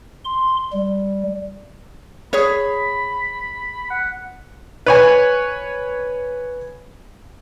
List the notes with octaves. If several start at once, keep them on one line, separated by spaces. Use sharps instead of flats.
C6
G3
G#4 C#5 B5
F#5
B4 C#5 G#5